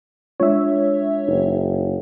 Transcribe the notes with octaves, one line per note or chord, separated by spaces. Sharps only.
G#3 D4 F4 C#5 E5
F#1 D#4